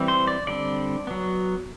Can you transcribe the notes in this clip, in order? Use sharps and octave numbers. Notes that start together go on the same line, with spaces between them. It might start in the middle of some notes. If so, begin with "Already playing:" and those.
Already playing: E3 G3 C4
C5
D5
D3 G3 C4 D5
F#3 B3